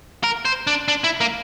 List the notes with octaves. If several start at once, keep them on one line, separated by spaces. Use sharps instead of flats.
A#4
C5
D4
D4
E4
A#3